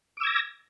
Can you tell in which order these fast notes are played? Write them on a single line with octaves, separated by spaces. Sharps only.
D6 E6 G#6 A#6